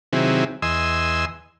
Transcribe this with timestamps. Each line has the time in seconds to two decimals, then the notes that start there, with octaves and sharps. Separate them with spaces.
0.13 C3 D#3 F#3 C4 E4 G#4
0.62 E2 D#5 G#5 C6 E6